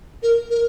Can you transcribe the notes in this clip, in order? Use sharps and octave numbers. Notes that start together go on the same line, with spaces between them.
A#4
A#4